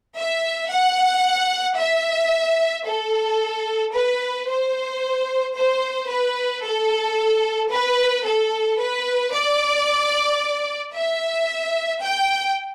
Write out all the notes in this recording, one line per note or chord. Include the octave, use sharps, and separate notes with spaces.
E5
F#5
E5
A4
B4
C5
C5
B4
A4
B4
A4
B4
D5
E5
G5